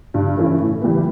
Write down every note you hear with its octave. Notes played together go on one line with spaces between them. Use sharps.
G2
E3 A3 C#4 E4
A2
E3 G3 B3